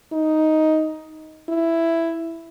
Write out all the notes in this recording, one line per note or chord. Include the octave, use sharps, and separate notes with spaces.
D#4
E4